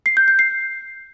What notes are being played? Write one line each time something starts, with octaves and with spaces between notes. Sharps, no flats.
C7
G6
G6
C7